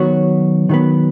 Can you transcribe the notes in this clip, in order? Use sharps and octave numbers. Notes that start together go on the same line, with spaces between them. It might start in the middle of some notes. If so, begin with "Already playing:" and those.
Already playing: D#3 F#3 B3 F#4 C#5
D#3 F#3 B3